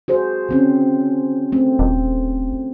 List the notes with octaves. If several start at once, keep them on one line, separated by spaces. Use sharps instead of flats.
F#4 G#4 C5
D3 C4 C#4
A3 C4
D#1